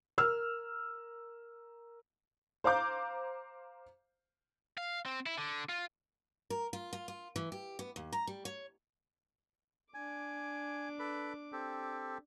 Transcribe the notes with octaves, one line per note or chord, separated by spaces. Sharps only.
A#4 E6 F6
C5 F5 A#5 D6 G6
F5
C4
E4
D3
F4
A#4
F4
F4
F4
E3
G4
B3
D#2
A#5
G3
C#5
D4 G#5 D6
A4 B4 B5
C4 G4 A4